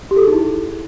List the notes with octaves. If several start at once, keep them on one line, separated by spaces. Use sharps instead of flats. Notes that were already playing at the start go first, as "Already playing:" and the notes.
G4
A4
G#4
D#4
E4